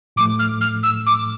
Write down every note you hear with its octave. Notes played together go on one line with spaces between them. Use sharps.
A2 F3 A3 D6
F6
F6
E6
D6